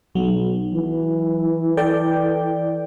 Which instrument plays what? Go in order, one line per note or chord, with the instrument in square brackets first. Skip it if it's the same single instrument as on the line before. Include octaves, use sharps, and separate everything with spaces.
[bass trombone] B1 [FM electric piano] F#3
[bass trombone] E3
[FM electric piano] A4 D5 G5